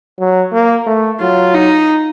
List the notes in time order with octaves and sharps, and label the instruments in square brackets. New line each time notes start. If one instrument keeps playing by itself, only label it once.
[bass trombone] F#3
A#3
A3
[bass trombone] F#3 [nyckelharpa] F4
[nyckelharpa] D#4